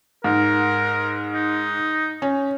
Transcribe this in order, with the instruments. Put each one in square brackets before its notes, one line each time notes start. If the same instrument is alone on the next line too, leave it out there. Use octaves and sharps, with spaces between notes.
[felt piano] G#2 [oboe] A#4
[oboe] D#4
[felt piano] C#4